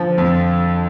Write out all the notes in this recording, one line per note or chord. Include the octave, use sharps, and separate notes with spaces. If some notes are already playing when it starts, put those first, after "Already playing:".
Already playing: D3 F3
F2